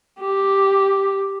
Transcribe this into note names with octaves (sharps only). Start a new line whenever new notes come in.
G4